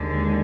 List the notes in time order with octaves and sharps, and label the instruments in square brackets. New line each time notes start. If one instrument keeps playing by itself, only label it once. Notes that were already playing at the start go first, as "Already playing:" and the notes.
Already playing: [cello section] D#2 D3 G#3